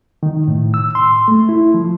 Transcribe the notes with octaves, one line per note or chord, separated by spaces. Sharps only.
D#3
A2
E6
C6
A3
E4
F3